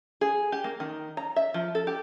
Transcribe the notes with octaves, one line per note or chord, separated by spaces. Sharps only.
G#4
G4
A#3
D#3
A#5
E5
F3
A4
G4